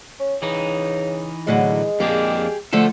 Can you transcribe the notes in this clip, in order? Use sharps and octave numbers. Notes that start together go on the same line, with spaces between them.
C#4
C#3 E3 D#4
A2 D3 F#3 G#3
F2 A#3 D4 G4 G#4
D3 F3 A3 A4